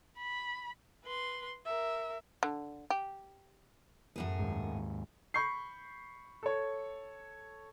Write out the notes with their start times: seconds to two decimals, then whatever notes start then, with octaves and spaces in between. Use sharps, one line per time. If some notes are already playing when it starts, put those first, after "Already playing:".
0.18 B5
1.04 B4 C6
1.65 A#4 E5
2.43 D3
2.90 G4
4.16 F#2 A2 G#4
4.39 D#2 G#2
5.34 B5 C#6 G6 C7
6.43 A4 C#5